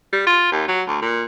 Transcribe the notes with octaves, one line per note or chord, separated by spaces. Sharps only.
G3
F4
D#2
F#3
D2
A#2